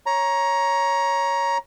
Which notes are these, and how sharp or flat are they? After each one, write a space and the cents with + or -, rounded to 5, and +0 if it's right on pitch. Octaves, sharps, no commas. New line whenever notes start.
C#5 +0 A#5 +15